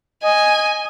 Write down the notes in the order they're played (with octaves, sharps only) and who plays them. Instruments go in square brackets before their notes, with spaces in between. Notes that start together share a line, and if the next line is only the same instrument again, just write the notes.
[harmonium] D#5 [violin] G#5